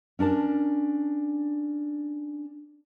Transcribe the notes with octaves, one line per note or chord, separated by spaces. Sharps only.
C#4 D4 A#4 A5